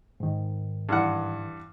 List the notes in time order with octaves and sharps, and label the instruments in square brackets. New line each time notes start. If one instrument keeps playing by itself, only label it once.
[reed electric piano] G#2 D#3
[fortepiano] G2 E3 F#5